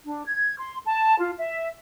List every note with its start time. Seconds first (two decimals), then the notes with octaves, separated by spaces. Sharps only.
0.05 D4
0.25 G#6
0.58 C6
0.86 A5
1.19 F4
1.38 E5